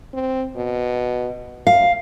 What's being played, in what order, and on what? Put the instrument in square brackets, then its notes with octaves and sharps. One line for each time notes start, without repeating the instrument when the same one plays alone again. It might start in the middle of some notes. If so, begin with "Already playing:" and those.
[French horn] C4
B2
[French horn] F#2 [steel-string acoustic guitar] F5